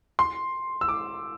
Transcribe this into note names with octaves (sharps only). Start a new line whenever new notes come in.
C6
E6
D6